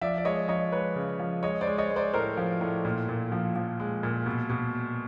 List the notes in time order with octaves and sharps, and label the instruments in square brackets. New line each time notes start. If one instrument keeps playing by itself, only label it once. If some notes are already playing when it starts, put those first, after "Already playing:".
[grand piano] F3 D5 E5
D5
G#3 C#5 D#5
F3 C#5 D#5
G#3 B4 C#5
C#3
F3
G#3 C#5 D#5
C5 D5
G#3
C#5 D#5
G#3
C5 D5
A2 A#4 C5
F3
A2
A#2
A#2
F3
F3
G#3
A#2
B2
B2